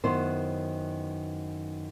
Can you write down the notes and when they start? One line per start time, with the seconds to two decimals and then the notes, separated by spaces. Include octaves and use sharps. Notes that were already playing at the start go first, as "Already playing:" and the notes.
0.04 F#2 D#3 B3 E4 C5